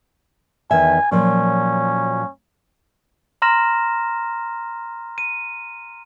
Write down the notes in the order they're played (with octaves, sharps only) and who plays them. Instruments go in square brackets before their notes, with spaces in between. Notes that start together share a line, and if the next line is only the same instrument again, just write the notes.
[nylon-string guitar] E2 D#3 E5 [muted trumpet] G#5
[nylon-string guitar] A#2 F3 F#3 [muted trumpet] C#4
[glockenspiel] A#5 C6 F6 A#6 E7
D#7